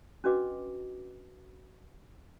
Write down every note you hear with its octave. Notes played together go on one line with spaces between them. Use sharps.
C#4 D4 F#4 B4 D#5 D6